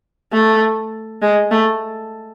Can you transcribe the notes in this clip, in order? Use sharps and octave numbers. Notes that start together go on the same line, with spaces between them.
A3
G#3
A3